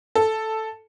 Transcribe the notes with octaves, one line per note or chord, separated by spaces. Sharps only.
A4